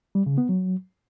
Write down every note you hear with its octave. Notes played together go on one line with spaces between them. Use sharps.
G3
C#3
B3
F#3